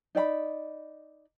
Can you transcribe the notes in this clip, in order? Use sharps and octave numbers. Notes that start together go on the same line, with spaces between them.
D#4 D5 F5 B5